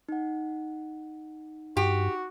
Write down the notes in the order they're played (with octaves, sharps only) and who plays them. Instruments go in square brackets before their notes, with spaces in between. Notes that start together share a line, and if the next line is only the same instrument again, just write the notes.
[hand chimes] D#4 F#5
[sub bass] G2 [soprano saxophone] F#4 [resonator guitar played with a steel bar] G4